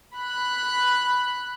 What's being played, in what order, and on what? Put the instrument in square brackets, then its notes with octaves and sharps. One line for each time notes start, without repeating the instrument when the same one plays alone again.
[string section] B5 F#6